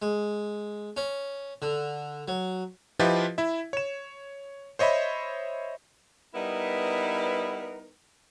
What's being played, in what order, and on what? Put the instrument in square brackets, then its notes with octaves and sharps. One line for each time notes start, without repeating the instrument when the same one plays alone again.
[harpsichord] G#3
C#4
D3
F#3
[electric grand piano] F3 E4 F4 G4 B4 D#5
E4 E5
C#5 E7
C5 C#5 D#5 E5 B5
[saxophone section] G3 B3 D#4 E4 A#4 B4